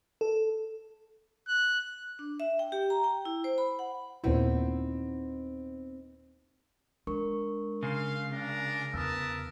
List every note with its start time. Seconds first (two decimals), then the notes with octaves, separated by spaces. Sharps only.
0.21 A4
1.48 F#6
2.19 D4
2.40 E5
2.59 G5
2.72 G4
2.90 A#5
3.04 G5
3.25 E4
3.44 C5
3.58 B5
3.79 F#5
4.24 D#2 A#2 B3 C4 D#4 E4
7.07 G#3 D4 A#4 C#6
7.83 C#3 F5 C6
8.32 C#4 D4 A#4
8.94 E2 A#4 B4 A5 D#6 E6